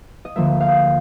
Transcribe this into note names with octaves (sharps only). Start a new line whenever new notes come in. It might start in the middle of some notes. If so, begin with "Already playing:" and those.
D#5
D2 D3 F3 A#3 E5
F5